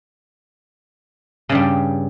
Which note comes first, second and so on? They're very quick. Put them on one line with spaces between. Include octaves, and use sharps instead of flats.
C#3 G2 G3